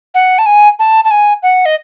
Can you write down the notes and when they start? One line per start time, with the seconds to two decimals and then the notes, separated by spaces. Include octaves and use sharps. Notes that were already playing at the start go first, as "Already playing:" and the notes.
0.15 F#5
0.39 A5
0.46 G#5
0.79 A5
1.05 A5
1.11 G#5
1.43 F#5
1.66 D#5